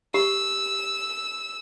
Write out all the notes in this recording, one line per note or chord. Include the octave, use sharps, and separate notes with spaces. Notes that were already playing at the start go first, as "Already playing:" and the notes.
G4 E6